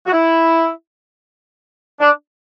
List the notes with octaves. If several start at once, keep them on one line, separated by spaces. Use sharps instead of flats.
F#4
E4
D4